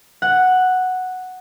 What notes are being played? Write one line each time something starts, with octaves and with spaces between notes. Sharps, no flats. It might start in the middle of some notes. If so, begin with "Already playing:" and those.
F#5